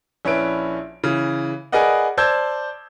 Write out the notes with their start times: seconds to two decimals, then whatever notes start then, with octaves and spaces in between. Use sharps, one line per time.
0.25 A#1 C#4 E4 B4 D7
1.04 C#3 E3
1.72 G#4 A#4 B4 D5 D#5 F#5
2.18 C5 D5 A5 E6 G6 G#6